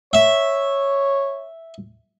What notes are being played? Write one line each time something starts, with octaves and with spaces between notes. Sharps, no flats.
C#5 E5